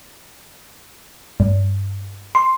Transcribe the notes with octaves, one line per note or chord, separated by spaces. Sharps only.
G2
C6